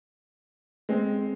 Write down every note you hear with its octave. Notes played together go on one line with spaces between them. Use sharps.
G#3 C4